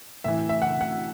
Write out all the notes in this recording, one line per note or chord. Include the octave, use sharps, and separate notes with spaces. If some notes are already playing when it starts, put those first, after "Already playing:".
A2 E3 E5
E5
F#5
F#5